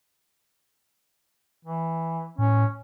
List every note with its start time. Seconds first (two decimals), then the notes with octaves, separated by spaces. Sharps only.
1.65 E3
2.38 A2 C#4